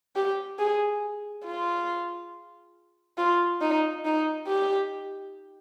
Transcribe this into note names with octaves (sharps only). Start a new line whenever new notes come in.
G4
G#4
F4
F4
D#4
D#4
G4